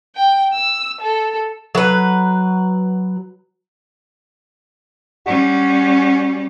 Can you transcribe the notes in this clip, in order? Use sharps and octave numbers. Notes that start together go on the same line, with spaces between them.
G5
E6
A4
F#3 B4
G3 C#4 F#4